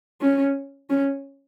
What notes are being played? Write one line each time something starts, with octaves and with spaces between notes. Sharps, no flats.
C#4
C#4